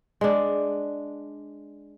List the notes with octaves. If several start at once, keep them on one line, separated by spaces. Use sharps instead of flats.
G#3 D4